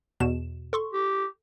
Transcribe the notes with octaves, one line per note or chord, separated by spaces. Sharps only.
E2 B2 E7
A4 C6 C#6
G4